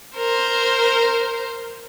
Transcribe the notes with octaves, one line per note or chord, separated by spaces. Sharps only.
A#4 C5